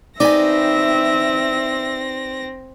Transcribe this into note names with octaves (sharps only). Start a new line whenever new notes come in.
C4 D#4 G4 B4 D5 E5 G#5 A#6